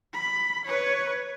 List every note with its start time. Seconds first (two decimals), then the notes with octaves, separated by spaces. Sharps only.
0.13 B5
0.65 B4 C#5